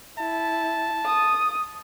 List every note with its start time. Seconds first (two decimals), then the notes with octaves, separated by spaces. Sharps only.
0.19 E4 A5
1.06 D#6